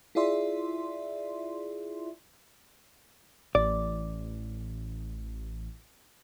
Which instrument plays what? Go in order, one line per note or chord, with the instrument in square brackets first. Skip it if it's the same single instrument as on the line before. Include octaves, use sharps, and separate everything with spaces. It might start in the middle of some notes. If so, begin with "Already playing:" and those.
[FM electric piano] E4 F4 G#4 D5 E5 C6
[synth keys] A1 [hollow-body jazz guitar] D5